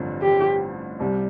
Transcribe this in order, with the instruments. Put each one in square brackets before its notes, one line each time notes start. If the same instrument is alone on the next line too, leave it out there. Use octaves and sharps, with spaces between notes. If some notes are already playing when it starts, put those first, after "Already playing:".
Already playing: [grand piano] A1 G2 D3 F3 C4
[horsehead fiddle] G4
[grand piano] C2 C3 G3